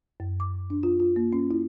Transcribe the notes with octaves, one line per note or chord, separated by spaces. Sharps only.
F#2
D6
D4
F4
F4
A#3
C#4
E4